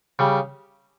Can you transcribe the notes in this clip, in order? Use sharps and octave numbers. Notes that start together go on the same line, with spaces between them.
C#3 G3